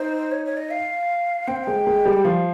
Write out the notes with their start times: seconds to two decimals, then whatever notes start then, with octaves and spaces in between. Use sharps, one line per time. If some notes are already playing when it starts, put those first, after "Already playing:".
Already playing: D#4 C5
0.31 C#5
0.46 C#5
0.57 D#5
0.71 F5
1.47 C4 G5
1.56 F5
1.64 G#3 G5
1.87 G#3
2.05 G3
2.25 F3 F5